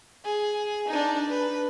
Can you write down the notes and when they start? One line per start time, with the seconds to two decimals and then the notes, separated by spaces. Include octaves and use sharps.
0.24 G#4
0.88 D4 D#4
1.29 B4